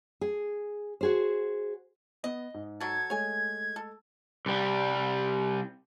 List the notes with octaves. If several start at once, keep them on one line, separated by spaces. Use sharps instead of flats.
G#4
F#4 G#4 C5
B3 D#5
G#2
F#3 A4 G#6
G#3 A3 C#5 G#5
A4
C2 G3